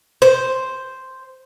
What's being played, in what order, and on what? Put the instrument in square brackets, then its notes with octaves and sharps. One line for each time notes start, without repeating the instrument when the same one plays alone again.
[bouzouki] C5